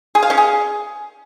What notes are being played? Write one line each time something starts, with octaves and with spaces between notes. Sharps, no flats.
G#4
F5
C#4
G#4